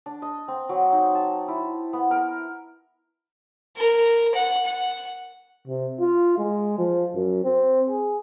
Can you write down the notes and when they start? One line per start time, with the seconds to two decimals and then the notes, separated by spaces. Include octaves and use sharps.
0.06 D4
0.22 D#5
0.48 C4
0.69 F#3
0.92 D#4
1.15 A5
1.48 E4
1.93 B3
2.11 A#4
3.77 A#4
4.35 F#5
4.66 F#5
5.67 C3
6.00 F4
6.38 G#3
6.78 F3
7.15 F#2
7.44 C4
7.89 G#4